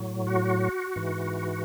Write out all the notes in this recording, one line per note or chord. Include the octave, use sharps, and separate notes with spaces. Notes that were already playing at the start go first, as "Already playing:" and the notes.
Already playing: A2 F#3
F#4
G#2 E3